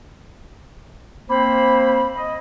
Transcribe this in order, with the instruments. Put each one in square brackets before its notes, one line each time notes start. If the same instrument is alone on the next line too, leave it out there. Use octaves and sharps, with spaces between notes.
[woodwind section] A#3 C4 C5 [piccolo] B5
[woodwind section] D#5